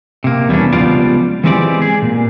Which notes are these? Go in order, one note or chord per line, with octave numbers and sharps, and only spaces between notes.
C3 A#3
E2 G3 A3 C#4 D4
C#2 F3 G3 B3 F4 D5
E3 G#3 B3 C4 G4 D5
G#4
A#2